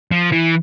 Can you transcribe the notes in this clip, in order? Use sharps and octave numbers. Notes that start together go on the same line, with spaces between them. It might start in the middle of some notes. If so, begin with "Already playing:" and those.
F3
E3